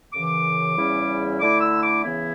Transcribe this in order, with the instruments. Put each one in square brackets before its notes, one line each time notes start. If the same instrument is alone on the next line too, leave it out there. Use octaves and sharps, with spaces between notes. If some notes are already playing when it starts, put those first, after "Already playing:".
[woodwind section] F#2 C#3 E3 D6
E2 C#3 G3 C#4 E4
D3 A3 E4 D6
E6
D6
C#3 E3 B3 E4